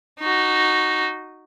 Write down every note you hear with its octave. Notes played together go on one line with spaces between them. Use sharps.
D#4 F#4